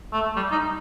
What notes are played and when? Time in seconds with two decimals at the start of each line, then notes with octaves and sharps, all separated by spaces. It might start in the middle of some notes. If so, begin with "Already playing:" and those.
0.13 A3
0.36 G3
0.52 D#4